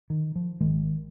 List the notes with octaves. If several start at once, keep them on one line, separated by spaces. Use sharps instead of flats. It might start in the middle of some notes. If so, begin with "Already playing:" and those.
D#3
F3
G#1 G#2 D#3 G#3